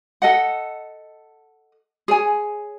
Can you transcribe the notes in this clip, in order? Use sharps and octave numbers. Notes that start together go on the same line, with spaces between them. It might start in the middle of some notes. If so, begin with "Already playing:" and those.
A4 D#5 F#5
G#4 C#5 G#5